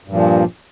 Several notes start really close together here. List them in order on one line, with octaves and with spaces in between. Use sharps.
G2 A#2 F3